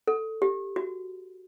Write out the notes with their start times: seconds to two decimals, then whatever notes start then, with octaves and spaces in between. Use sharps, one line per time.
0.08 A4
0.42 G4
0.76 F#4